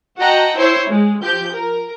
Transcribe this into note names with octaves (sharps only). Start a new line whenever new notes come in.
F#4 D#5 F#5 G5 A5 A#5
E4 C5 C#5 C7
G#3
F3 G4 G6
A#4